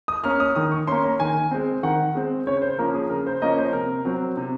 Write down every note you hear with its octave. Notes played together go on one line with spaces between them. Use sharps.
D#6
A#3 C#4 F6
D#6
D#3 D#6
C#6
A#3 C#4 C6
A#5
D#3 G#5
G#3 C4
D#3 F#5
G#3 C4
C#3 C#5
C5
F3 A#3 C#4 A#4
G#4
C#3 A#4
C5
F3 A#3 C#4 D#5
C5
C3 A#4
F#3 C4
C3